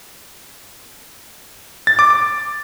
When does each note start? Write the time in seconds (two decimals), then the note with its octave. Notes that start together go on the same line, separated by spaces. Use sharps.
1.87 A6
1.99 D6
2.10 D6